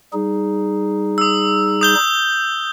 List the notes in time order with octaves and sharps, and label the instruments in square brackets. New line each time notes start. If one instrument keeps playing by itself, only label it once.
[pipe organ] G3 D#4 G#4
[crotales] D#6 E6
D#6 G6 G7